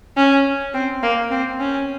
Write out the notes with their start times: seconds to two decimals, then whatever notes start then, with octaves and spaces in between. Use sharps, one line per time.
0.17 C#4
0.74 C4
1.03 A#3
1.31 C4
1.59 C#4